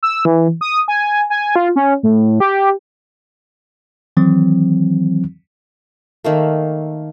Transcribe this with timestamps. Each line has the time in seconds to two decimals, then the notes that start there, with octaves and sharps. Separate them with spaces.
0.03 E6
0.25 E3
0.61 D#6
0.88 G#5
1.30 G#5
1.56 F4
1.76 C#4
2.03 A2
2.40 G4
4.17 D#3 E3 F#3 C4
6.24 D#3 A3 A#3